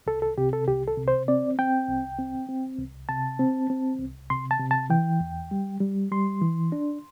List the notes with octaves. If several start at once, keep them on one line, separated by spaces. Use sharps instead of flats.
C2 A4
A4
C3 G4
A4
C2 G4
A4
C3
C5
C4 D5
C4 G5
C2
C4
C4
C2
C3 A5
C4
C4
C2
C3 C6
A5
C3
A5
E3 G5
E2
G3
G3
G3 C6
E3
D4